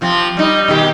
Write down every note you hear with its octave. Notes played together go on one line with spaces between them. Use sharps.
C3 F3 C4
G3 D#4
B2 D#3 G4